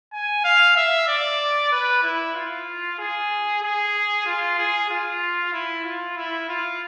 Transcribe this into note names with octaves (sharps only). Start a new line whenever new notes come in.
G#5
F5
E5
D5
B4
E4
F4
G#4
G#4
F4
G#4
F4
E4
F4
E4
F4